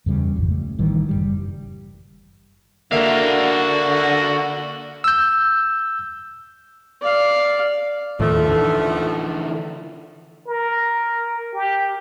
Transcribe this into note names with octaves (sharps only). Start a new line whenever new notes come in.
E2 C#3 G3
G#1 F2
A3
A1 D#3 E3 G3
F#1 C#2 G3
D3 A#3 F#4 E5 F5
E6 G6
D5 F5
D#2 A2 F3 A3
D3 E3
A#4
G4